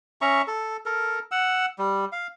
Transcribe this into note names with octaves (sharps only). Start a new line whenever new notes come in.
C#4 E5 A#5 C#6
A4
A4 A#4
F#5 E6
G3
F5